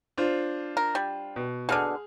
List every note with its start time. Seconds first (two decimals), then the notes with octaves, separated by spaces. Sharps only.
0.18 D4 F4 C5
0.77 A#4
0.95 G3
1.36 B2
1.69 B2 D3 G#4 F6